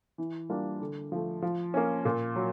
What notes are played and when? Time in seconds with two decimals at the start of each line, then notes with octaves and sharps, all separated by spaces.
0.18 E3
0.49 G3 A#3 D4 F4
0.81 D3
1.12 F3 A3
1.42 F3
1.74 A#3 C#4
2.05 A#2
2.36 F#3